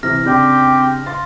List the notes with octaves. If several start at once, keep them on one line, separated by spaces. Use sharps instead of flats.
C3 E3 F6 A#6
C#3 C4 D4 G4
F5 C6 A6